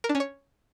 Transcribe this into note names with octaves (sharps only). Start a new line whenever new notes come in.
A#4
D4
C#4
C#5